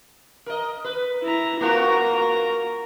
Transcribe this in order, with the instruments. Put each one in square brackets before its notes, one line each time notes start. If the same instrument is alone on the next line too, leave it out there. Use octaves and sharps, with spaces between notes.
[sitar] A#4 D#5
B4
[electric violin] E4 A#5
[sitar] A#3 F4 F#4 [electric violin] A#4 A#5